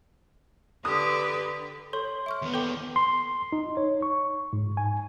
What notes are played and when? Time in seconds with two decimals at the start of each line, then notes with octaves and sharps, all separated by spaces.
0.85 D3 G4 B4 D#6
1.93 A4 C#5 C6
2.26 E5 C#6 F6
2.42 D#2 B3
2.54 A4 G5 D6
2.96 C6
3.52 D#4
3.77 C#5
4.02 C#6
4.53 G#2
4.77 G#5